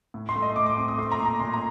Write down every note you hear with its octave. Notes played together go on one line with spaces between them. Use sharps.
A2
C6
A3
D#5
A2 D6
D6
C4 D6
D#6
A3 C6
A#5
A#2
A#5
A#2 C6
A#5